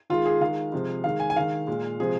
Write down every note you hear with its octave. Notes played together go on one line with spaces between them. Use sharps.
D#3 G#3 F4
G#4
D#3 G#3 F5
C3 F3 G#3
D#3 G#3 F5
G#5
G#5
D#3 G#3 F5
A#2 G#3
C3 F3 G#3 G#4